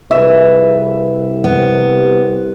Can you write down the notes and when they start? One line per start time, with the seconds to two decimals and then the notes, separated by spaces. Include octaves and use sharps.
0.11 C2 F2 G#4 B4 E5
1.44 C3 B3